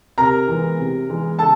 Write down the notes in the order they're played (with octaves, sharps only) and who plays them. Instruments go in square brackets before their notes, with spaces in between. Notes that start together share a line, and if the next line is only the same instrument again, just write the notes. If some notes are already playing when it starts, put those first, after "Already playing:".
[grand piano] C3 A#4 A#5
E3 G#3 B3
C3
E3 G#3 B3
C#3 A4 A5